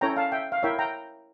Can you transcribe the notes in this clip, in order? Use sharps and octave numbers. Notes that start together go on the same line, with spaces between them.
C#4 E4 A4 C#5 G5 A#5
F5 A5
E5 G5
F5
E4 A#4 C#5 E5 G5
G5 A#5